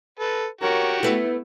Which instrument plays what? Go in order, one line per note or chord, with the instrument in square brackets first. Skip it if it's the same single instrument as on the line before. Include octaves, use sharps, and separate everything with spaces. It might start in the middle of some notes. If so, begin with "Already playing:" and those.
[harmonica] A4 B4
[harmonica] F#4 G4 [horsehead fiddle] A#4 C#5
[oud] A3 B4 [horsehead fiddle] B3 E4